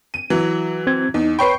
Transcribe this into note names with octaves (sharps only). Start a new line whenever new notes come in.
D#7
E3 F#3
C4 G#6
E2 D#4
B4 C#5 G5 B5 C#6 C7